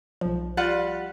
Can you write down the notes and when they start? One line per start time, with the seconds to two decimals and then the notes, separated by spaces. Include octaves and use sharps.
0.21 B1 F3
0.57 G3 F4 F#5